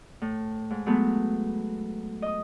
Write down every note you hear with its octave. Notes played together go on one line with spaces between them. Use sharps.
A2
G#2
F#3 G#3 A3 B3
D#5 D#6